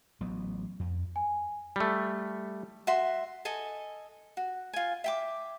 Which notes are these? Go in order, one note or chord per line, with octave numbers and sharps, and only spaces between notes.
A1 F#3 B3
F2
G#5
G3 A3
F#4 E5 C6
A4 D#5 G#5
F#4
F4 G#5
E5 G5 D6